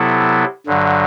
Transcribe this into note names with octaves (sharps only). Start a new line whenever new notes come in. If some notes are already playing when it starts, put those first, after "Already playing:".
Already playing: C3 F#3 B3 E4 A4
G2 D3 F#3